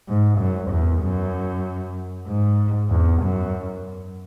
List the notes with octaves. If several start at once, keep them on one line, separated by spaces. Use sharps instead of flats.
G#2
F#2
E2
F#2
G#2
E2
F#2